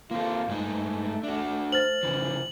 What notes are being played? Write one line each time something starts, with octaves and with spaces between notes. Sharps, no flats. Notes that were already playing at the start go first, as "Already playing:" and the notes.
A#3 C4 F4 A4
G2 G#3 A3 D#4
D4 F#4
C5 F6 A6 F#7
C#3 E3 F3